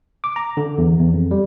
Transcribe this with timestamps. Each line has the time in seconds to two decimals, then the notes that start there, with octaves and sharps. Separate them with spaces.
0.24 D6
0.36 A#5
0.57 D3
0.78 E2
1.00 E2
1.14 F2
1.31 G3